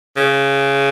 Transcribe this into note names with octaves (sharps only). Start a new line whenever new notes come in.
C#3